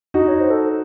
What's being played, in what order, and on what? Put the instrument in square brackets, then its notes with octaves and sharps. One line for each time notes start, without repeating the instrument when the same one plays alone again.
[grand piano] D#4 F#4 [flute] D#5
[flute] C#5
C5
A4